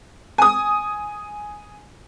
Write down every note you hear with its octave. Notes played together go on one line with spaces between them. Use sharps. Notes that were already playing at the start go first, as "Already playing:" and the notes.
G#5 D#6